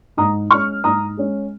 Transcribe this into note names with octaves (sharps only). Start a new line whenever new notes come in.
G#2 A#5 D#6
G#3 C#4 C#6 F6
G#2 A#5 D#6
G#3 C#4